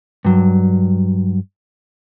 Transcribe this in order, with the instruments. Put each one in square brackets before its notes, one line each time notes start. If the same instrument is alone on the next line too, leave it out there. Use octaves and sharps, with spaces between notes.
[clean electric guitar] G2 F#3